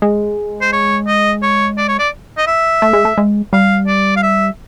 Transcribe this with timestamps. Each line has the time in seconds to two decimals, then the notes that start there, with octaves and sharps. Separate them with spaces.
0.02 G#3
0.61 C5
0.72 C#5
1.07 D#5
1.42 C#5
1.77 D5
1.88 C#5
1.99 D5
2.37 D#5
2.47 E5
2.82 A3
2.93 G#3
3.05 A3
3.18 G#3
3.53 G3 F5
3.87 D5
4.16 F5
4.23 E5